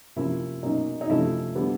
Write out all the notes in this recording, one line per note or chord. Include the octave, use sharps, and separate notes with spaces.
C3 F3 A#3 C#4 E4
B2 F#3 A#3 C#4 D#4
D#4
C3 F3 A3 C#4 E4
D3 G3 B3